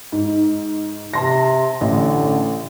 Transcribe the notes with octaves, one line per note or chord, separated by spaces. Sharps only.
G#2
C3 A5 C6 A#6
A1 D3